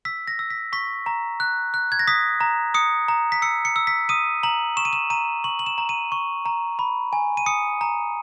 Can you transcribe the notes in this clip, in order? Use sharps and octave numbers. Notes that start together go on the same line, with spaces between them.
E6 B6
A#6
E6
B6
C#6 B6
A#5
F#6
F#6
G#6
A#6
D#6 B6
A#5
D#6 C#7
A#5
B6
E6 C#7
C#7
E6
B6
D#6 D#7
A#5 F#7
C#6 E7
D#7
E7
A#5 D#7
C#6 F#7
F#7
E7
A#5
D#7
C#6
A#5
B5
G#5
D#7
D#6 C#7
A#5